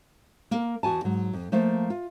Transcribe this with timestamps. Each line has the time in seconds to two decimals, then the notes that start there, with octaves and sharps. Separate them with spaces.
0.51 A#3 A#4
0.83 E2 F#4 G#5 A5
1.04 G#2 F#3
1.33 F2
1.52 F3 A3 A#3 C5
1.90 F4